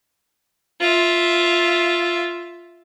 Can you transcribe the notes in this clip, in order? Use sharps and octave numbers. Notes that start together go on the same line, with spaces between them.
F4 E5